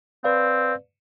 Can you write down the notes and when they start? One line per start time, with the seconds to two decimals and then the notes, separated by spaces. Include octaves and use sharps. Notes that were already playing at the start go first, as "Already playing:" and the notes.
0.24 C4 B4 D5 F5